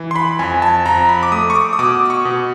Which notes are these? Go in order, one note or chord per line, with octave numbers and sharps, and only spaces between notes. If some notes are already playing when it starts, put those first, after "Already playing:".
Already playing: E3
C6
B5
F2 G#5
A5
F2 A#5
B5
D6
A3 D#6
C#6
D6
D#6
B2 D6
D6
C#6
B2